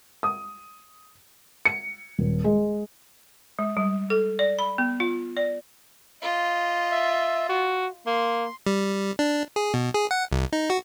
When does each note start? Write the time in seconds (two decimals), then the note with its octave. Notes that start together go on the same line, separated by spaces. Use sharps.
0.23 D#6
1.65 C#7
2.19 D#1
2.44 G#3
3.59 G#3
3.77 G3
4.10 A4
4.39 D5
4.59 B5
4.78 B3
5.00 F4
5.37 D5
6.22 F4 D#5
6.92 E5
7.49 F#4
8.06 A#3 C6
8.67 G3
9.19 D4
9.56 G#4
9.74 B2
9.94 G#4
10.11 F#5
10.32 C2
10.53 D#4
10.70 F#4